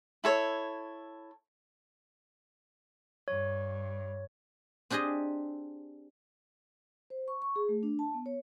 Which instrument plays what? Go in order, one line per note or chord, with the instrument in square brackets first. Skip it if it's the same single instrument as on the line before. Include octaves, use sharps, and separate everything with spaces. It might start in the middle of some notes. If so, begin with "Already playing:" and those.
[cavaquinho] E4 A4 C#5
[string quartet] G2 [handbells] C#5
[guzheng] C4 D4 G4 G#4 D#5
[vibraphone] C5
C#6
C#6
G#4
A3
D4
A5
B3
C#5